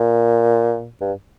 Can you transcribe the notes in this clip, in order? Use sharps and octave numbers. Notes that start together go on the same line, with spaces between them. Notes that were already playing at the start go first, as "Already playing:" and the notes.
Already playing: A#2
G2